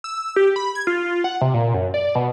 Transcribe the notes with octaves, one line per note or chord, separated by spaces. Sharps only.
E6
G4
B5
G#6
F4
F#5
C3
A#2
F#2
D5
B2